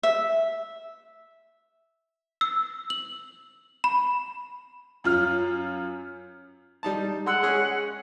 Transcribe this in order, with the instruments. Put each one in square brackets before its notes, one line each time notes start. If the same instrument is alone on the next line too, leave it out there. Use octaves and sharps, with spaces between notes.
[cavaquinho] E5
[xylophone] E6
F#7
B5
[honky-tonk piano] F#2 F4 F6
[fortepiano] G3 D#4 A5
[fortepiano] G#3 C6 E6 [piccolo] F#5
[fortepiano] G#3 C#4 G#4